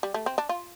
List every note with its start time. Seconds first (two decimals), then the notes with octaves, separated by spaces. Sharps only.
0.03 G3
0.14 A3
0.26 C4
0.38 D4
0.49 F4